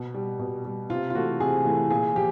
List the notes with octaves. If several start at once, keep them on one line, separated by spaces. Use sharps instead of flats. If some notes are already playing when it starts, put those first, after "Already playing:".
Already playing: B2
G3
B2
G3
C3 F4
F4
E3 A3 F#4
C3 G#4
E3 A3
A#2 G#4
F3 G4